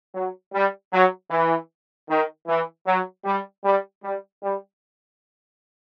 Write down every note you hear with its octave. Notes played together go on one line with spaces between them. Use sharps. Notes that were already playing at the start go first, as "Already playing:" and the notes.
F#3
G3
F#3
E3
D#3
E3
F#3
G3
G3
G3
G3